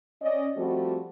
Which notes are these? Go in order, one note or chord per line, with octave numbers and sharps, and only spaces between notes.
C#4 D5 D#5
F3 G3 A3 C4 F#4